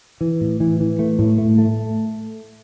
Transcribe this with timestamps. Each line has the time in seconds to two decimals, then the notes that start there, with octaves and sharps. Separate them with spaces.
0.21 E3
0.41 A2
0.60 E3
0.80 E3
0.99 A3
1.19 A2
1.38 A3
1.58 A3